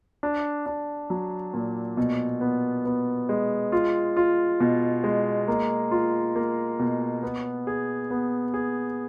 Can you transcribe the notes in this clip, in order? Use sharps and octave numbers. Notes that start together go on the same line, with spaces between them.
D4
D4
F#3
A#2
B2
B3
B3
G#3
F4
F4
B2
G#3
A#3
F4
A#3
B2
B3
G#4
B3
G#4